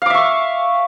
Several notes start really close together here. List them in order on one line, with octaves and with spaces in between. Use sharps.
F5 D6 E5 C#6